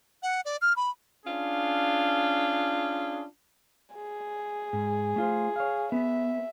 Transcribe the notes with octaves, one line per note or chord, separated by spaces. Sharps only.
F#5
D5
F6
B5
C#4 D4 F4 G#4
G#4
G#2
A3 F4 C5
C#5 F5
B3 E5